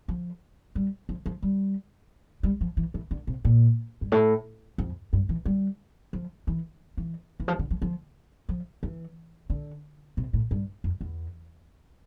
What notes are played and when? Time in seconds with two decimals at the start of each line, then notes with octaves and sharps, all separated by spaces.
0.08 F3
0.75 G3
1.09 F3
1.26 F3
1.42 G3
2.43 G3
2.61 F3
2.77 E3
2.94 E3
3.11 D3
3.27 C3
3.45 A#2
4.01 G2
4.12 A2
4.78 F2
5.13 G2
5.29 E3
5.45 G3
6.13 F3
6.47 E3
6.97 E3
7.40 E3
7.48 F3
7.59 D3
7.70 F3
7.82 F3
8.49 F3
8.83 E3
9.50 D3
10.17 C3
10.33 A2
10.51 G2
10.84 F2
11.01 E2